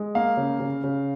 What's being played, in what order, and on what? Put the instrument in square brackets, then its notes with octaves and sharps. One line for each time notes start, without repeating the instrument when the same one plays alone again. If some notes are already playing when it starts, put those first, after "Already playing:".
Already playing: [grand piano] G#3
A#3 F5
C#3
C#3
C#3